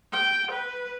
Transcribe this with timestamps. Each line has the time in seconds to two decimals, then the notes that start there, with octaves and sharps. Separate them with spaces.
0.12 G5
0.51 B4